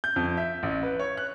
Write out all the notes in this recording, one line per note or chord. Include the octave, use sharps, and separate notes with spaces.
G6
F2
E5
A1
B4
C#5
F#6